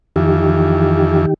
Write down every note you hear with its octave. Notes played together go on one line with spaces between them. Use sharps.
F2 D#3 E3 G4